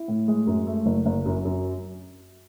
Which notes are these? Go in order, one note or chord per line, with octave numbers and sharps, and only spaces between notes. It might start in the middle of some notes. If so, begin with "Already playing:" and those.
Already playing: E4
A2
G#3
F#2
A3
F#1
F#1
F#2
F#2